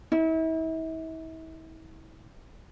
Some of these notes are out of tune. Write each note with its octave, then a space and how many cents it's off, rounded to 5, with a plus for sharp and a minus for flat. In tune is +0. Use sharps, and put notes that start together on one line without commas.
E4 -40